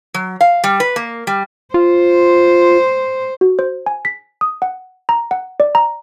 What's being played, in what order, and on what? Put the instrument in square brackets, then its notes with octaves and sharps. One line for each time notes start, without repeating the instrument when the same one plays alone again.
[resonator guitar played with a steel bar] F#3
F5
G3
B4
A#3
G3
[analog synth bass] F4 [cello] C5
[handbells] F#4
C5
G#5
B6
D#6
F#5
A#5
F#5
D5
A#5